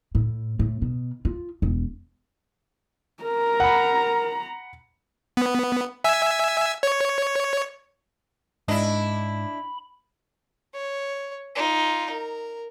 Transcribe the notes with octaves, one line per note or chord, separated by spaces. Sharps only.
A2
A2
B2
F4
E1
A#4 A#5
F#5 B5
B3
E5 G#5 E6
C#5
G#2 D4 E4 D#5 B5
C#5
D#4 F4
A#4